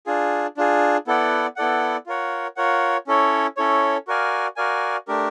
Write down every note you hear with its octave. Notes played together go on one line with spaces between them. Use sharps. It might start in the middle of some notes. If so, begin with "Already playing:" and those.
D4 F4 G#4
D4 F4 G#4
B3 E4 A4 D5 F#5
B3 E4 A4 D5 F#5
F4 A#4 C#5 F#5
F4 A#4 C#5 F#5
C#4 E4 A4 C#5
C#4 E4 A4 C#5
F#4 A#4 D5 F5 G#5
F#4 A#4 D5 F5 G#5
A3 D4 G4 A#4